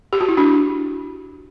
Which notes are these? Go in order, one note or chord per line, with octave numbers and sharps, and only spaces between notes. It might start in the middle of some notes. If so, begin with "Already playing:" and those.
G4
F#4
E4
D4 F#4